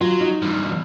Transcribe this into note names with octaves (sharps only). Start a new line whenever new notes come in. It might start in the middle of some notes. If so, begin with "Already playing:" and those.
F#3 F4
D#4
E2 G2